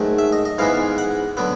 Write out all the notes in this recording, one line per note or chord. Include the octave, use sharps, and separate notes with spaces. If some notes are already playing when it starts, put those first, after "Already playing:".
Already playing: G#2 D#3 F#3 A3
E5
D#5
D#5
G#2 E3 G#3 B3 F5
F#5
D3 F#3 B3